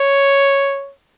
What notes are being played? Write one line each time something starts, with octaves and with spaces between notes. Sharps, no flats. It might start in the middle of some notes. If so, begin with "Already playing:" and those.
Already playing: C#5